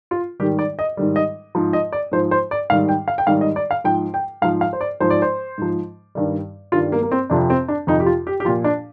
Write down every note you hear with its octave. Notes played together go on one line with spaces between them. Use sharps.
F4
G#2 D#3 G3 G4
D5
D#5
G#2 D#3 G3
D#5
G#2 F3
D#5
D5
G#2 F3 C5
C5
D5
G#2 D#3 G3 F5
G5
F5
G5
G#2 D#3 G3 F5
D#5
D5
F5
G#2 F3 G5
G5
G#2 F3 F5
F5
C5
D5
G#2 F3 C5
D5
C5
G#2 F3
G2 D#3 G3
G2 D#3 G3 F4
A#3
A#3
C4
F2 C3 F3 D4
C4
D4
F2 C3 F3 D#4
G4
F4
G4
G4
A#2 F3 F4
D4